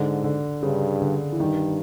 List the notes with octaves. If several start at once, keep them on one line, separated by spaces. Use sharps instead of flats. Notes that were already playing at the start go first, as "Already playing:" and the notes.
Already playing: G#2 D3
D3
G2 C#3
D3
E3
G2 D#3